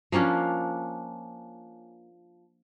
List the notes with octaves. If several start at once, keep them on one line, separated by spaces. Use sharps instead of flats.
F3 A#3 C#4 D4